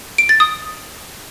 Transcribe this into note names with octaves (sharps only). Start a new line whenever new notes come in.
D7
A6
D#6